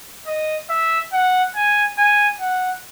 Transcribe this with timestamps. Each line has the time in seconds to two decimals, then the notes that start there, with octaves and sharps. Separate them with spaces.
0.27 D#5
0.70 E5
1.13 F#5
1.55 G#5
1.98 G#5
2.41 F#5